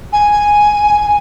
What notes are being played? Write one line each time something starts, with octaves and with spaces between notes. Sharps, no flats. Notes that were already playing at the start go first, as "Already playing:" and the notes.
G#5